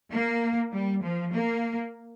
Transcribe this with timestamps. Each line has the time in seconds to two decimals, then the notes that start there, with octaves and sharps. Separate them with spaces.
0.12 A#3
0.73 G3
1.04 F3
1.34 A#3